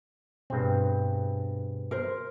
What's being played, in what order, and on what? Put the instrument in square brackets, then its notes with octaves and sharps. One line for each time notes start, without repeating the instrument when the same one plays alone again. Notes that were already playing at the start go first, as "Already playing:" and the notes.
[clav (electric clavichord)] G2 C4 [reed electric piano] B2 G#4 B4
[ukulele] A#4 C5